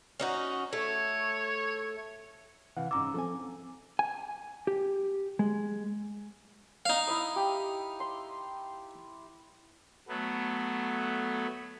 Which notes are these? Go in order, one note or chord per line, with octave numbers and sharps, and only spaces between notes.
C#4 D#4 F#4
A3 C#5
C3 E3 F5 F#5
D#2 G#2 C#4 A#5 D6 E6
F3 C4 A4 G#5
G#5
G4
G#3
D#4 F5
E4 E5 D#6
G4
C6
F#3 A3 B3